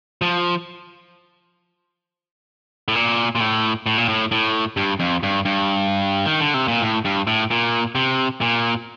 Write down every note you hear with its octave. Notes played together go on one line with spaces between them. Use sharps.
F3
A2
A#2
A#2
A2
A2
A#2
A2
A2
G2
F2
G2
G2
D#3
D3
C3
A#2
A2
G2
A2
A#2
C3
A#2